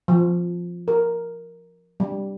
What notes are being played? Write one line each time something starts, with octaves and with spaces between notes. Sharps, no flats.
F3
A#4
G3